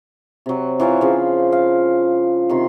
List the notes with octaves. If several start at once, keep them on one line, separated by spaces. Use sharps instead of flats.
C3 F#3
E3 F#3 F4 F5
C#3 F3
F5
C3 D#3 C6